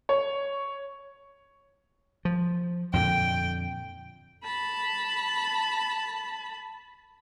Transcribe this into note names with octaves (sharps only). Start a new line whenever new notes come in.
C#5
F3
F2 A#2 D3 G5
A5 B5